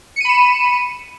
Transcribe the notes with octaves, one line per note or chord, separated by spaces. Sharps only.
B5 C#7 D#7 E7